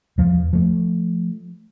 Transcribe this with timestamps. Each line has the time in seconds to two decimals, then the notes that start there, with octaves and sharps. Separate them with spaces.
0.18 E2 F3
0.53 F3 A3